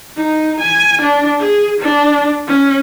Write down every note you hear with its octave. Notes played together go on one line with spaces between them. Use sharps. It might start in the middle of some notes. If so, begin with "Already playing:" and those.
D#4
G#5
D4
G#4
D4
C#4